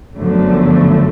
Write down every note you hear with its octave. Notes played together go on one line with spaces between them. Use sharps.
G1 F#2 D3 F3 A3